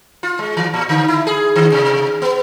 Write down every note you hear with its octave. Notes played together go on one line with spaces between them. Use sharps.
F4
G#3
E3
A#2
D3
E4
G#4
D#3
C3
B3